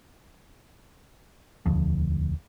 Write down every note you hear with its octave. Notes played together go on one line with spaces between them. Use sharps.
E1 D2 F3